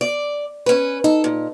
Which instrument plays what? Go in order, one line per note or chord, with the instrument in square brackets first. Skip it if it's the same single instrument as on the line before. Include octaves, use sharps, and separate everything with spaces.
[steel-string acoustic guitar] D5
C#4 B4
[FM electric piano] D#4 [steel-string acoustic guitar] A4
[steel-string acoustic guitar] A#2